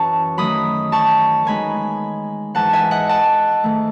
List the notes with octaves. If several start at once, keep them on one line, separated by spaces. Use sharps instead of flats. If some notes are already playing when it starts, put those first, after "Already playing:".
Already playing: F#2 E3 C#4 A5 C#6
D#3 F#3 A3 D#4 B5 D#6
A5 C#6
D#3 G#3 B3 D#4 G#5 B5
G#2 E3 G#3 D#4 F#5 A5
E5 G#5
D#5 F#5
F#5 A5
G#2 D#3 A3